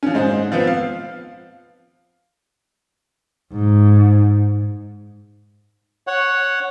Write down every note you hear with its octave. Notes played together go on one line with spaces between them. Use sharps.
F3 C#4
G#2 D#4 C5
F3 B3 C4
F5
G#2
C#5 F#5